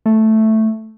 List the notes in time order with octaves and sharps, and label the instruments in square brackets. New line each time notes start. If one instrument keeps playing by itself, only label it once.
[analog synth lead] A3